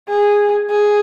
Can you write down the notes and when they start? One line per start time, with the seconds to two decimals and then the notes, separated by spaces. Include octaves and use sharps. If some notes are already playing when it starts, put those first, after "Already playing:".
0.09 G#4
0.70 G#4